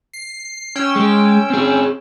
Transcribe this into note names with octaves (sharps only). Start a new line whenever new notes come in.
C7
C#4 G5 E6
G#3
C4 G#4